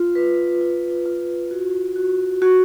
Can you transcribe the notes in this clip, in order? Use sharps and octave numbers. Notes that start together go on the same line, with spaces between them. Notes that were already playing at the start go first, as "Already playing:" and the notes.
Already playing: F4
B4
F4
F4
F#4
F#4
F#4